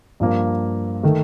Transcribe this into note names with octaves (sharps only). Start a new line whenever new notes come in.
G2 F3 A#3
D#3 A3